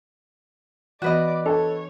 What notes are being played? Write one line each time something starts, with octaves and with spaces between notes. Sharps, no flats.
E3 B3 F#4 B4 D5 D#5
D4 A4 C#5